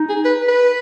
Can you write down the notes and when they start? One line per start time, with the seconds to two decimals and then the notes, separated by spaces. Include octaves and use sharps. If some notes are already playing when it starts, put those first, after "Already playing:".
Already playing: D#4
0.09 G#4
0.25 B4
0.49 B4